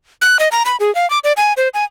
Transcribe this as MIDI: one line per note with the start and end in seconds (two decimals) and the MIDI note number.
0.22 0.37 90
0.39 0.48 75
0.52 0.63 82
0.66 0.76 83
0.80 0.93 68
0.95 1.09 77
1.10 1.19 86
1.24 1.32 74
1.37 1.53 80
1.57 1.68 72
1.74 1.84 80